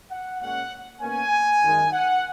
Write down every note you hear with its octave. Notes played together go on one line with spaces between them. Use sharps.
F#5
A#2 G#3 C#4 F#5
B2 A#3 C#4 G#5
F#2 D#3 G#3
F#5